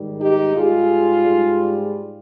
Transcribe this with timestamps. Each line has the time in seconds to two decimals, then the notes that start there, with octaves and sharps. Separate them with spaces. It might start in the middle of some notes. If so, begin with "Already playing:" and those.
Already playing: G#2 D#3 G3
0.19 D#4 G4
0.54 G#2 G3 F4 G#4
1.26 G#2 G3